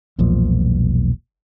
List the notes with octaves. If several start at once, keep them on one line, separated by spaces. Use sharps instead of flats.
E1 B1 A#2 F3